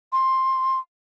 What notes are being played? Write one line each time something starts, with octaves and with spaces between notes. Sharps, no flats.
C6